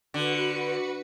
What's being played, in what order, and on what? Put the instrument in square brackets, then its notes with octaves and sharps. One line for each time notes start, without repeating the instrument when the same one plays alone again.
[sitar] D3 [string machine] F#4 B4 C#7